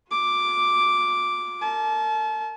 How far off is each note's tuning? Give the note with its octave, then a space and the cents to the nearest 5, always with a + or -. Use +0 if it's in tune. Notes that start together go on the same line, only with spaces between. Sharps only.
F4 +45 D6 +0
A#4 -30 A5 -35